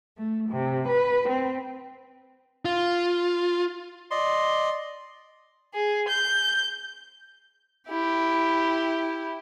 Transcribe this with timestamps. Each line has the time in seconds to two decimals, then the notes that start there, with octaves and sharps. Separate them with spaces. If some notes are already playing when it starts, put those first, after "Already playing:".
0.18 A3
0.49 C3
0.88 B4
1.28 C4
2.65 F4
4.11 D5 D#5 C6
5.74 G#4
6.09 G6
7.88 E4 G4